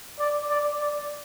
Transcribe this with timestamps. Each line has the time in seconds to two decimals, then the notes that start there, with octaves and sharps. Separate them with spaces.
0.19 D5
0.49 D5
0.80 D5